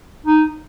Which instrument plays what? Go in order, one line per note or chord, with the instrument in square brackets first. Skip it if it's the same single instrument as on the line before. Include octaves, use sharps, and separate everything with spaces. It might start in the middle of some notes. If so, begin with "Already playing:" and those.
[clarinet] D#4